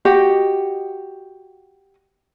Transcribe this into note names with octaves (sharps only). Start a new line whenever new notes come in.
F#4 G4 D#5 F#5